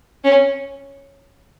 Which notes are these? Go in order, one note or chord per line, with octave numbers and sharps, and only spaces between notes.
C#4